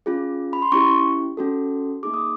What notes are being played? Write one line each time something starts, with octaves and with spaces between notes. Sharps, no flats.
C#4 F4 G#4
B5
C6
C#4 E4 G4 C#6
C#4 F#4 A4
A#3 D#4 G#4 D6
D#6